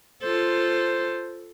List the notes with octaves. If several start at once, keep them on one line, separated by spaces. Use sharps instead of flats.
F4 A4 C5